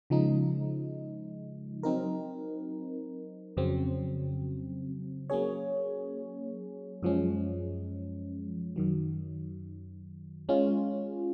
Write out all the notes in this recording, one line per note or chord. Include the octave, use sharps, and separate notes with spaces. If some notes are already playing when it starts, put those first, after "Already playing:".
C#3 F3 G#3 D#4
F#3 C4 D#4 A#4
F2 C#3 F#3 C4
F#3 A#3 C#4 G#4 C#5
F#2 F3 G#3 C#4
F#2 D#3 F#3
G#3 C#4 F4